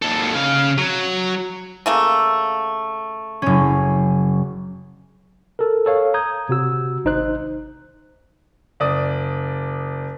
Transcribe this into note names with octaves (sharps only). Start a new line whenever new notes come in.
D#2 A4
C#3 F5
F#3
C#3 A3 A#3
F#1 C#4
A4 A#4
A4 C#5 F5
A#5 D#6 G6 G#6
C3 F#4 E6
G#1 D#4 C5 F#6
F#1 D5 D#6